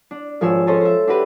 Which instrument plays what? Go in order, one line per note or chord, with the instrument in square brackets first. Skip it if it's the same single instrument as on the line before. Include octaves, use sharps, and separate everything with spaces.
[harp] D4
G#1 F3 G#4 C#5 E6
C#4 A4 C5 C#5 D#5 A5
C5 E5
D4 F#4 G4 B4 G5